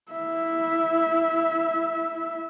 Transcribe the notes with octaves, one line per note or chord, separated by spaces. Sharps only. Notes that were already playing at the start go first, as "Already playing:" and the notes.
E4 E5